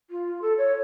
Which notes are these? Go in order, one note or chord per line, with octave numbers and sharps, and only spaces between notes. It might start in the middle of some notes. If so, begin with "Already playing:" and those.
F4
A4
C#5